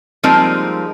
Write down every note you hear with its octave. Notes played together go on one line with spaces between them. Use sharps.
F3 G3 G#3 A#3 C4 D#4